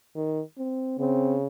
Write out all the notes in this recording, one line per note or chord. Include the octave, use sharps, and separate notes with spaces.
D#3
C4
C#3 C4